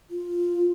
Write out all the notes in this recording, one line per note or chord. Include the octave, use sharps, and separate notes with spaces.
F4